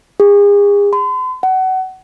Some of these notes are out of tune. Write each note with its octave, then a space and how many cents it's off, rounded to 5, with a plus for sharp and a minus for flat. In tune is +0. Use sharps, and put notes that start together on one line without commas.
G#4 -40
C6 -45
F#5 +25